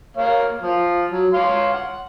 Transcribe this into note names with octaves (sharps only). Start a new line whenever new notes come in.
A#3 C#5 F5
F3 F4
F#3
C#5 F5 C6
F#5